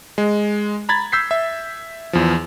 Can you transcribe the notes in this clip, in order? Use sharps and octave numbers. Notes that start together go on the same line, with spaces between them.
G#3
A#5 B5 G#6 A6
E6 G6 B6 C7
E5
E2 F3